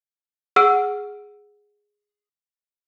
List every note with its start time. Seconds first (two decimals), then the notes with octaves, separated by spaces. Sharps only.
0.56 G#4 F#5 E6 F6 D7